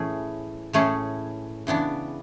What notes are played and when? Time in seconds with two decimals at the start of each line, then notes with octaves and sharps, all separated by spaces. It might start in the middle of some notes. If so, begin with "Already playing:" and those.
Already playing: A2 E3 A3 C#4 G#4
0.73 A2 E3 A3 C#4 G#4
1.67 C#3 E3 B3 D4